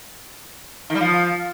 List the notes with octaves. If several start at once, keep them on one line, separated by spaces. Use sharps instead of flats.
D#3
G3
F3